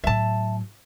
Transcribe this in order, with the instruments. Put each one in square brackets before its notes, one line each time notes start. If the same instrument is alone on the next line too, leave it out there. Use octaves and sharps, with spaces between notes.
[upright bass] A2 F#3 [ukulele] E5 A5